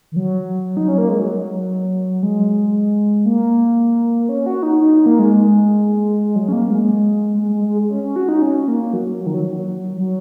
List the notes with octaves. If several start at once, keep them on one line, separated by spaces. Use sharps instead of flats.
D#3
F#3
D#4
C#4
A#3
G#3
F#3
G#3
A#3
C#4
F#4
D#4
D#4
D#4
A#3
G#3
F#3
C#4
A#3
G#3
G#3
G#3
G#3
C#4
C#4
F#4
D#4
C#4
A#3
F#3
F#3
D#3
F#3
F#3
F#3